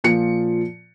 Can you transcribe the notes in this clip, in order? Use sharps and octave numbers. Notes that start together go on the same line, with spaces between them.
A#2 F3 C#7